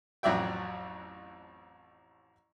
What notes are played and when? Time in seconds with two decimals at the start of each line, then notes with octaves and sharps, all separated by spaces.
0.23 A1 F2 F#3 D5 E5 G5